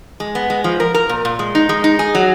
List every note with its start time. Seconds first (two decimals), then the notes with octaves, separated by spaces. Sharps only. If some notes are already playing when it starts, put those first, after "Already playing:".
0.20 G#3
0.35 B3
0.50 G#3
0.64 F3
0.80 A#4
0.94 A#4
1.09 A#2
1.25 A#2
1.39 G#3
1.55 D#4
1.69 G#3
1.84 D#4
1.99 G#4
2.15 F#3